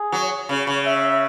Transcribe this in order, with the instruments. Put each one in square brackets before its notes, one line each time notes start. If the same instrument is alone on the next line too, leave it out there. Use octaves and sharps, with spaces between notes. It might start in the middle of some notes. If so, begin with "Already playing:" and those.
Already playing: [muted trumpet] G#4
[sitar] F#3
C#3
C#3
[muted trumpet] E5